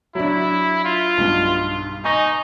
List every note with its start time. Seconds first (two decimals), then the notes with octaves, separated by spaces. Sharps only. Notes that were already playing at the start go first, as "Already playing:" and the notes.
0.15 F#3 D4 E4
0.85 F4
1.18 B1 G2
2.04 D#4 G#5 C#6 A#6